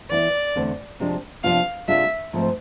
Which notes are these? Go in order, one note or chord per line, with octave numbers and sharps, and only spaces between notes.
E3 B3 E4 D5
E2 D3 A3 C4
C3 F3 G#3 D4
C3 F3 B3 D4 F4 F5
C3 G#3 D4 F4 E5
G#2 F3 A3 C4